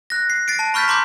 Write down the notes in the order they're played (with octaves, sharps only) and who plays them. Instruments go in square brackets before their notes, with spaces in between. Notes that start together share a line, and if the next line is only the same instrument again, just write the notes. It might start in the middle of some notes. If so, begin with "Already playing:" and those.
[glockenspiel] F#6 A#6
C7
A6 C7 D7
A5
B5 C#6 F6 G6 A6 B6
A#5 C6 D6 G6